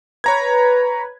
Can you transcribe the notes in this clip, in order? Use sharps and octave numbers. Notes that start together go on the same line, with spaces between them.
B4 C#5 A#5 G#6